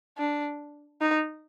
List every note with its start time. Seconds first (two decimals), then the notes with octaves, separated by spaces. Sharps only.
0.18 D4
1.01 D#4